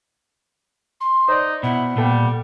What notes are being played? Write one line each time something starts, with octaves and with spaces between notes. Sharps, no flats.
C6
D#4 C5 D5
B2 E4 F#5
A#2 G3 B3 A4 G5